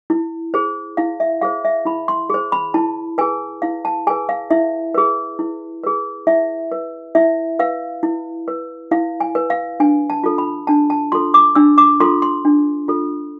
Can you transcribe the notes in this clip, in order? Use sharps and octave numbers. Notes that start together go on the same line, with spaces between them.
E4
G#4 C5
E4 F5
E5
G#4 C5 F5
E5
E4 B5
C6
G#4 C5
B5
E4 A5
G#4 B4 G#5
E4 F5
A5
G#4 B4 G#5
F5
E4 E5
G#4 B4
E4
G#4 B4
E4 E5
B4
E4 E5
B4 F5
E4
B4
E4 F5
G#5
B4
F5
D4 G#5
A5
F4 A4
B5
D4 A5
A5
F4 A4 C6
D6
D4 E6
D6
F4 A4 C6
C6
D4
F4 A4